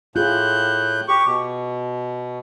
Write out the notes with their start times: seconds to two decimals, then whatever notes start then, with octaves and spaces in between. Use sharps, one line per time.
0.16 A2 F4 G#4 F#6 G6
1.08 G4 C#6
1.26 B2